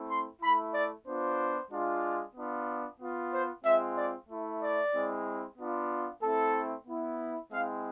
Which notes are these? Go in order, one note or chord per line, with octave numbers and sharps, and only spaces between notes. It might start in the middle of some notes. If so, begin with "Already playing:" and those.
Already playing: A3 C4 E4
C6
A3 E4 B5
D5
B3 D4 F4 C5
G#3 D4 F4
B3 D4 F4
B3 F4
C5
G#3 C4 F4 E5
D5
A3 E4
D5
G#3 C4 E4
B3 D4 F4
A3 C4 E4 A4
B3 E4
G#3 C4 E4 F5